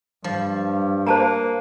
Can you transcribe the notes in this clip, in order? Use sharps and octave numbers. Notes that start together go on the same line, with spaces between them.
G2 F3
A#3 C5 A5 A#5